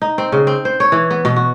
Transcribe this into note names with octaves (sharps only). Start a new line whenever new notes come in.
D#4
C4
C#3
C4
C5
C#5
E3
B3
B2
F#4